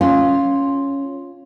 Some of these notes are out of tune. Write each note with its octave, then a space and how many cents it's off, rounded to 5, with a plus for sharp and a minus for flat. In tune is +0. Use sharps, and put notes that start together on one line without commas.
C#4 +0 F4 +0